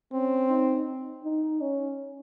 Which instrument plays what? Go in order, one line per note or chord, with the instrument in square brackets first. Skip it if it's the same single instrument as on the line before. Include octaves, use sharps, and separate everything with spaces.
[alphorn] C4 [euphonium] C#4
[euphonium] D#4
D#4
C#4